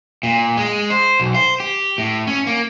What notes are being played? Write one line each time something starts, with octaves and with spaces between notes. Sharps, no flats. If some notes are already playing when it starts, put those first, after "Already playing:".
A#2
G#3
C5
B1
C5
G4
A2
C#4
A#3